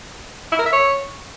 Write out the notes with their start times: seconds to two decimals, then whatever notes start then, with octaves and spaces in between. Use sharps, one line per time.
0.52 E4
0.59 A#4
0.66 E5
0.72 C#5